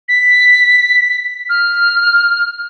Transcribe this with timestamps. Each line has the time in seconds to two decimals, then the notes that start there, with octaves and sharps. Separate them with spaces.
0.08 B6
1.49 F6